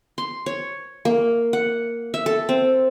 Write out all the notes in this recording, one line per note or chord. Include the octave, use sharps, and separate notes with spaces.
C6
C#5
A#3
F#5
E5
A4
C4